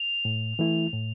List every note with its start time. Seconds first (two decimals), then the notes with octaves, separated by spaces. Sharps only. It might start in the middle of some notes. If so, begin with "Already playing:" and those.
Already playing: F7
0.25 A2
0.59 E3 A3 E4
0.93 A2